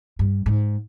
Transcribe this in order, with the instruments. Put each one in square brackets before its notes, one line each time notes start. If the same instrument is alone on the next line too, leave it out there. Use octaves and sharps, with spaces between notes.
[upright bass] G2
G#2